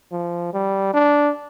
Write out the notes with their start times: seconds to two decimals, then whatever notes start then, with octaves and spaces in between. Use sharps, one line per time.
0.12 F3
0.54 G3
0.94 D4